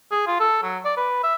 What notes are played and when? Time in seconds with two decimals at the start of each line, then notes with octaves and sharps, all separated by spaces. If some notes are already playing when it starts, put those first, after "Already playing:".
0.11 G#4
0.27 F4
0.40 A4
0.63 F#3
0.85 D5
0.97 B4
1.23 E5